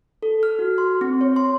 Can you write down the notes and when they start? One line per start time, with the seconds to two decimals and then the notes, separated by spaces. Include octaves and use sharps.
0.23 A4
0.43 F6
0.59 F#4
0.78 C6
1.01 C4
1.21 C#5
1.36 C6